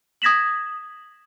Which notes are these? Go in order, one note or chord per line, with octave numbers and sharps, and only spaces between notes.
D#6 G#6 A#6 B6 E7 F#7